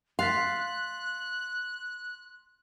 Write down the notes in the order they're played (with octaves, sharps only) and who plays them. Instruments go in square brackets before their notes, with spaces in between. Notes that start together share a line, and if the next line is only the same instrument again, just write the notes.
[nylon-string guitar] F5 [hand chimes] C6 A6 B6 [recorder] F#6